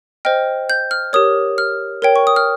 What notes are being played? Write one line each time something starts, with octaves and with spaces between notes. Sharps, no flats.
C5 D#5 G5 F6
G6
F6
G4 A#4 C#5 D#6
F6
A#4 C#5 G5
C#6
D#6
F6